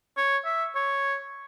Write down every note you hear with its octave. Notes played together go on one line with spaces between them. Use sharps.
C#5
E5
C#5